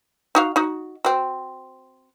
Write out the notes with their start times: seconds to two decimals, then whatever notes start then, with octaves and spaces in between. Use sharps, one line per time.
0.35 D#4 F#4 F5
0.56 D#4 F#4
1.05 C4 F#4